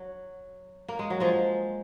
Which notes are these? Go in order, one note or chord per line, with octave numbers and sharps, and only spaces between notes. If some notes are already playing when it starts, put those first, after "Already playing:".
Already playing: F#3
A#3
G#3
F#3
F3 G#3